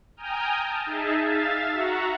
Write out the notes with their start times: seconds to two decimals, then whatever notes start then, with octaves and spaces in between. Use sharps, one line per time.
0.17 G5 G#5 A#5 D#6 F6 G6
0.58 A5
0.86 D#4 G#4 E5 A5
1.19 E5 F5 A6
1.72 F#4 E5 F#5 A#5